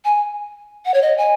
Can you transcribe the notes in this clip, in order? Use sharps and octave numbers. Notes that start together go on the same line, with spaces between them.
G#5
F#5
C#5
D#5
G#5